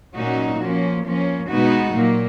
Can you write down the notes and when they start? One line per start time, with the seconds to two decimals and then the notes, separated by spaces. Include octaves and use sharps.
0.14 A#2 F#3 C#4 D#4 F#4
0.59 F3 A#3 C#4
1.04 F3 A#3 C#4
1.49 B2 G#3 B3 D#4 F#4
1.95 A#2 F#3 A#3